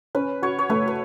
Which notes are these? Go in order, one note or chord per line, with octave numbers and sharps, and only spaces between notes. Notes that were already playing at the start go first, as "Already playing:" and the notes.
C#4 B4
F#4 C#5
C#5
A3 B4
B4